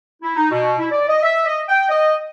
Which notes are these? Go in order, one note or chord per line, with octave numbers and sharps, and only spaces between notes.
E4
D#4
B2
E4
D5
D#5
E5
D#5
G5
D#5